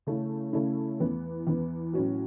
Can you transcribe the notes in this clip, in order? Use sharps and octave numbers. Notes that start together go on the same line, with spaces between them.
C#3 A3 C#4 E4
C#3 A3 C#4 E4
E2 E3 B3
E2 E3 B3
A2 F#3 C#4 F#4